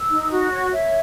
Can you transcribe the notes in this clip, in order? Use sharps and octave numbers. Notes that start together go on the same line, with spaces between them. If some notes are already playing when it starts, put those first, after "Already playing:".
Already playing: E6
D#4
F#4
C#5 C#6
C#5 E5